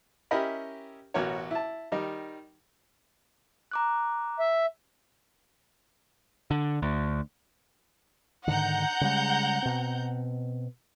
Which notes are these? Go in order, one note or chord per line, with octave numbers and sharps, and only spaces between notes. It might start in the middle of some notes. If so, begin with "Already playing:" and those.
C#4 E4 G4 A#4 D#5 B5
A1 B2 F#4 A#4 C#5
E4 A5
D#3 G3 D#4
A#5 D6 F#6
E5
D3
D2
G#2 D3 D#3 F#5 A#5 G6
C#3 G3 G#3
B2 C4